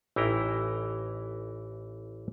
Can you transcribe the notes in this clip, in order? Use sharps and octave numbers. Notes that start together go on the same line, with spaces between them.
A1 E3 D#4 E4 G5 A#5